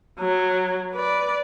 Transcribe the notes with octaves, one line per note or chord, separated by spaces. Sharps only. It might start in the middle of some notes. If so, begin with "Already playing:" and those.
F#3
B4 D5